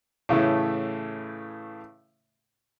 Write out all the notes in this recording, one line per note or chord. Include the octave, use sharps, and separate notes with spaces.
A2 C#3 E3 A3